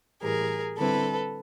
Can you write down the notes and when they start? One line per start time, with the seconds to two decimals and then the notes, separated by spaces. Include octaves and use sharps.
0.22 A2 E3 G3 G#4 A#4
0.77 D3 G3 C4 E4 A4 B4